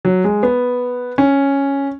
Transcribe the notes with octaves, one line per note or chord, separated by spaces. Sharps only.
F#3
G#3
B3
C#4